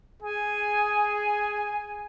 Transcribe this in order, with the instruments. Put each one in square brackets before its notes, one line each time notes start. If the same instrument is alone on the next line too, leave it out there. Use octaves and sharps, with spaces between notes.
[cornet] G#4 [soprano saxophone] G#5